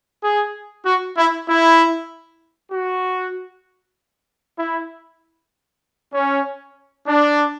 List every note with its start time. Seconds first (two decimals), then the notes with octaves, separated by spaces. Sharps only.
0.23 G#4
0.86 F#4
1.17 E4
1.48 E4
2.72 F#4
4.59 E4
6.13 C#4
7.07 D4